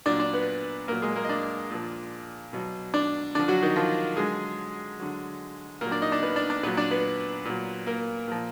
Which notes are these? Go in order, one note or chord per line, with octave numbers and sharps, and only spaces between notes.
A#2 F#3 D4 D5
D4 D5
B3 B4
A#2 F#3 A#3 A#4
G#3 G#4
A#3 A#4
D#5
D4 D5
A#2 F3
B2 F#3
D4 D5
D3 F3 D4 D5
F#3 F#4
D#3 D#4
F3 F4
D3 F#3 G#3 G#4
D3 F#3
A#2 F#3 A#3 A#4
D4 D5
D#4 D#5
D4 D5
B3 B4
D4 D5
D4 D5
A#2 F#3 B3 B4
D4 D5
B3 B4
A#2 F#3
A#3 A#4
A#2 F3